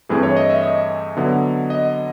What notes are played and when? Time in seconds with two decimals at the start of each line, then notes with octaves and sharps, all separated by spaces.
0.09 G2 E3 A3 C4 G#4
0.23 C#5
0.36 D#5
0.50 E5
0.63 D#5
1.17 D3 F#3 B3
1.70 D#5